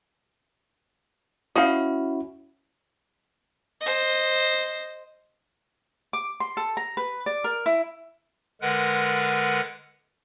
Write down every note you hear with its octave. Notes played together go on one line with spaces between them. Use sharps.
C#4 E4 F#4 D#5 F5
C5 D#5
D6
C6
A4
A#5
B4
D5
A#4
E4
D3 G#3 A#4 B4 F#5